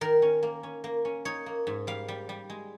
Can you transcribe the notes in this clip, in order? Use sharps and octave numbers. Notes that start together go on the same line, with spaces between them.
D#3 A#4
C#4
A#3
C#4
A#3
C#4
D#4 C#5
A#3
G#2
G3 F5
G3
G3
G#3